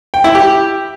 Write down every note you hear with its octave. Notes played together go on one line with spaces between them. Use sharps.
G5
E4
G4